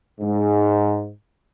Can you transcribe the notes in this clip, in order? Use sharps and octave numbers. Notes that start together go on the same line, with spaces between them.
G#2